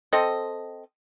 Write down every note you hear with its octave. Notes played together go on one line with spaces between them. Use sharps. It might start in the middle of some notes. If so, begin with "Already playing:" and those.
C4 A4 D#5